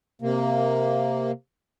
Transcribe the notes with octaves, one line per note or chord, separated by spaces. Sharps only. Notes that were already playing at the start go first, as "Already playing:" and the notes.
C3 A#3